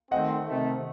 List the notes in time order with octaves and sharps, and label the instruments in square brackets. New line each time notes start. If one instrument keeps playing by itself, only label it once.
[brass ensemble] D#3 A3 C4 [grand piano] D#5 F#5
[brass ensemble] C3 D#3 A3